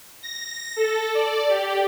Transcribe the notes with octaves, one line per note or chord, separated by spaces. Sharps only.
A#6
A4
D5
G4